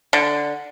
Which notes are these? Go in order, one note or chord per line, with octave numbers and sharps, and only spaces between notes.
D3